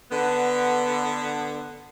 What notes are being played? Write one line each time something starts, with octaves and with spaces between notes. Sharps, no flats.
D3 B3